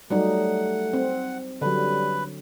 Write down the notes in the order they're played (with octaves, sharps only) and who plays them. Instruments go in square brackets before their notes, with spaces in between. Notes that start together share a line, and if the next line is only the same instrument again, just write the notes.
[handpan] F#3 G3 D#4 [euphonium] A3 [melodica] F#5
[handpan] C4
[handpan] D3 F#3 [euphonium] G3 [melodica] B4